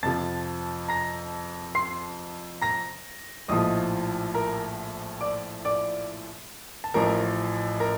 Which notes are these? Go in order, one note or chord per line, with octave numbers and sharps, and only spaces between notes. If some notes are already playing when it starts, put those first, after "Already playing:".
F2 C3 F3 A5 A6
A#5 A#6
C6 C7
A#5 A#6
A#1 A2 F3 D#5 D#6
A#4 A#5
D5 D6
D5 D6
A5
A1 A2 F3 A#4 A#5
A#4 A#5